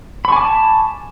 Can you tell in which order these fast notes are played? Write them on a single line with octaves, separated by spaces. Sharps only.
B5 C#6 G#5 D6 A5